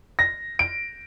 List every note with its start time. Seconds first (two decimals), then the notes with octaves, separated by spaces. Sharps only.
0.19 A#6
0.59 D7